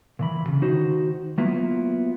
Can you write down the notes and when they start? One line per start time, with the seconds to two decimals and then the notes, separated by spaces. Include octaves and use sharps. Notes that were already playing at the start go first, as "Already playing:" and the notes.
0.19 A#2 E3 B5
0.44 D#2 C#3
0.62 D#2 D#4 F#4 C5
1.38 F#3 A#3 B3 E4 F4